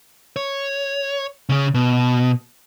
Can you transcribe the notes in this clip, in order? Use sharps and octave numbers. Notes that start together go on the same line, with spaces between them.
C#5
C#3 C#4
B2